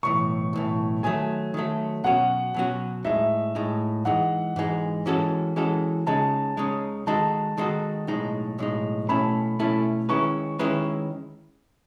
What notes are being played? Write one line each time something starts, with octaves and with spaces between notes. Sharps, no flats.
B1 A2 E3 C#6
B1 A2 E3
D#3 F#3 A3 G#5
D#3 F#3 A3
B2 F#3 C#4 F#4 F#5
B2 F#3 C#4 F#4
A2 G#3 D#4 E5
A2 G#3 D#4
G#2 E3 G#3 D#4 F#5
G#2 E3 G#3 D#4
E3 G#3 C#4 F#4 A4
E3 G#3 C#4 F#4 A4
C#2 C#3 G#3 D#4 A5
C#2 C#3 G#3 D#4
D#3 G#3 D#4 F#4 A4 A5
D#3 G#3 D#4 F#4 A4
B1 A2 G#3 D#4
B1 A2 G#3 D#4
B2 A3 C#4 E4 A4 B5
B2 A3 C#4 E4 A4
D#3 G#3 C#4 E4 B4 C#6
D#3 G#3 C#4 E4 B4